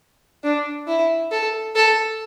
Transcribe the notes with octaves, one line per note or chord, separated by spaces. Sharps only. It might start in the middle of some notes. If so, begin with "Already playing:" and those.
D4
E4
A4
A4